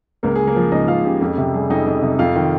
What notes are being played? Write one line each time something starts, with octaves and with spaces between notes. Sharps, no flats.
C#2 A#3 A#4
C#3 G#4
A#3 A#4
F3
C#2 D#4 D#5
C#2 F4 F5
C#3 G4
F2 G4
C3 G4
G3 G#4
F2 D#4 D#5
F2
C3
F2 F4 F5
D#3